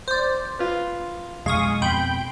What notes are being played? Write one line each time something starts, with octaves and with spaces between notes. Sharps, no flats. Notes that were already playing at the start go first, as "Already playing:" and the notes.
C5 D5
F4 B4
F1 B1 G#3 F5 C#6 D#6
F2 B2 G5 B5 C6 G6